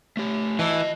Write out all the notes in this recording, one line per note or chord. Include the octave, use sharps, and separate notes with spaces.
A3 G4
E3 D#5 A5